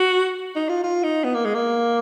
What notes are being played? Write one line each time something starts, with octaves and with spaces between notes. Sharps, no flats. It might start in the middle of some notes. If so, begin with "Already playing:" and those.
Already playing: F#4
D#4
F4
F4
D#4
B3
A#3
G#3
A#3